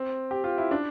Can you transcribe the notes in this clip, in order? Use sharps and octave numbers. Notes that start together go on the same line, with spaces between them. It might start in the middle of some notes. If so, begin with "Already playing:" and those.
Already playing: C4
G4
F4
E4
D4